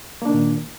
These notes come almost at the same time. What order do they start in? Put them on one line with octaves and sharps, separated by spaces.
A#3 D4 D#3 A#2